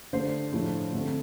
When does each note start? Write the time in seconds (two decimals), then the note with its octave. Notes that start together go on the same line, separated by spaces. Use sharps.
0.13 D3 A3 D4 C5
0.53 A2 F3 A3 D4
0.93 D3 A3 C4